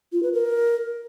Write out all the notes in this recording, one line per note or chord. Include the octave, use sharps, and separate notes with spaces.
F4
B4
A#4